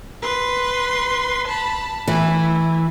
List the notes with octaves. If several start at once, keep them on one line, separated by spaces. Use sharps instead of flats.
B4 C6
A5 B5
E3 A3 E4